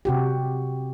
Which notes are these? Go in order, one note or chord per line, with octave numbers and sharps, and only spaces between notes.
C3 F#4 G4